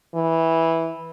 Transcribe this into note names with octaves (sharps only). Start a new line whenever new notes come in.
E3